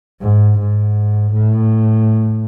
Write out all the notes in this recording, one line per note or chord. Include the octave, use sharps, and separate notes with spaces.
G#2
G#2
A2